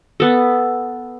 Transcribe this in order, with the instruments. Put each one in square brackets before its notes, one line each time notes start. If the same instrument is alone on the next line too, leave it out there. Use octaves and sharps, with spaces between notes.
[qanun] B3 A4